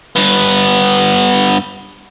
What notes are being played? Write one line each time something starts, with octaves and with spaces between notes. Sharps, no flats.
G2 B3